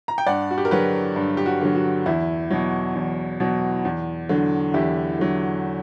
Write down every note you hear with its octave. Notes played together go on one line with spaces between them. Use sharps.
A#5
G5
G2 D5 F#5
F#4
G4
A#4
D3 F#3 G4 B4
G2
G4
F#4
D3 F#3
F#4
E2 E4
B2 F#3
E2
B2 F#3
E2
D3 F#3
E2 E4 G4
D3 F#3